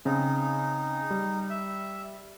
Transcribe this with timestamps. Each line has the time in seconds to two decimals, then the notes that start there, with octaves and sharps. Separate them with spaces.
0.05 C#3 C4 D#4
1.11 G3
1.50 E5